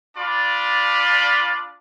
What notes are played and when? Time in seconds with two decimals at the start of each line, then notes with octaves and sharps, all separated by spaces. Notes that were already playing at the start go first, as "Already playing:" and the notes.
0.17 D4 F4 D5 B5